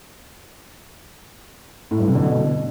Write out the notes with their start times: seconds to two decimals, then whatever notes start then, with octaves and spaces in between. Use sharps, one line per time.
1.91 A2
1.99 G2
2.07 C3
2.15 D3
2.23 B2